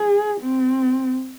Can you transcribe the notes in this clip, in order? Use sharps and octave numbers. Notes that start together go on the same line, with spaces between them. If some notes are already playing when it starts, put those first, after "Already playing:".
Already playing: G#4
C4